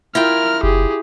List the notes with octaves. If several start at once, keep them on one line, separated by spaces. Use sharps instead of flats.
E4 F4 A#4 G5 F6
F#1 G4 G#4